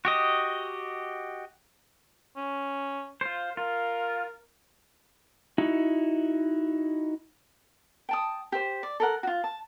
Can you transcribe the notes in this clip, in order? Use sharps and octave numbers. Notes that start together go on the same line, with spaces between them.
F#4 G4 D#5
C#4
F4 C5
F4 A#4
D#4 E4 F#4
G5 A5 D#6
G4 C5
D5
A4 A#4 F#5
F4 F#4
A5